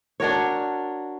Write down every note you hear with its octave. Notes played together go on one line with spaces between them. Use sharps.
D4 F#4 A#4 C#5